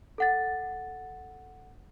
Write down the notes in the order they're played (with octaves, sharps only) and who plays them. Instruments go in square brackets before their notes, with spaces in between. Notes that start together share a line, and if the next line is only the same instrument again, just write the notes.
[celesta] A4 F#5 A6